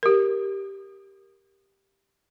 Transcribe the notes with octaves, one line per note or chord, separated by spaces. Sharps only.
G4 A#4